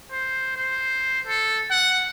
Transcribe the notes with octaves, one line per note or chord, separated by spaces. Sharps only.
C5
C5
A4
F#5